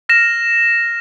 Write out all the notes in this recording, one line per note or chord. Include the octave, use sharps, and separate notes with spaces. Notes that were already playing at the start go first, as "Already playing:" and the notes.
F6 A#6 E7